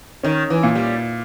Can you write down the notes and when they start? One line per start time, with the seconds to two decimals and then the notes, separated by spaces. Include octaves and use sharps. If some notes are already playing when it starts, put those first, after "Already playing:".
0.23 D#3 C#4
0.50 E3
0.63 A#2
0.75 G3